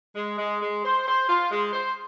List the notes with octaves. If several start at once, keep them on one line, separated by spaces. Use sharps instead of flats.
G#3
G#3
G#3
C5
C5
F4
G#3
C5